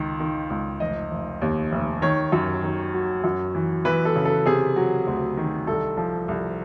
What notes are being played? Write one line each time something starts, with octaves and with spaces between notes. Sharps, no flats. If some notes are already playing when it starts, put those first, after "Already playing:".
Already playing: C#2 D#3
D#3
C#2
F1 D#5
F1
D#2
F1
D#3 C#5
F#2
D#3
F#3
F#2
E3
E3 B4
A4
C#3
A4
C3 G#4
F#3
D2
D#3
C2 A4
F3
C2